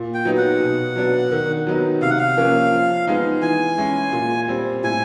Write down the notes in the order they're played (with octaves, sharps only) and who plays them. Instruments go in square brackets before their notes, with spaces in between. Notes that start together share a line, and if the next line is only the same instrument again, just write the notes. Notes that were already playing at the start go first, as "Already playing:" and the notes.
Already playing: [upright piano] A#2
[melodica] G5
[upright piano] F#3 B3 D#4
[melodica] F#5
[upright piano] B2
F#3 B3 D4
D#3
F#3 B3 D#4
[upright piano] C3 [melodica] F5
[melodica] F#5
F5
[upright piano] F3 A#3 C#4
F3
G#3 B3 D#4
[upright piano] E3 [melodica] G#5
[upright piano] G#3 C#4 E4
A#2
G3 C4
[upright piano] A2 [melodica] G#5